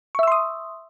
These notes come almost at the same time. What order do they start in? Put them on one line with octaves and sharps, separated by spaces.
C#6 E5 E6 C6 D#6